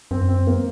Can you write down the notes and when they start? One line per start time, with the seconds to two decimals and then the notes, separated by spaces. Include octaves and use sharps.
0.11 F#2 C4
0.29 C4
0.47 A#3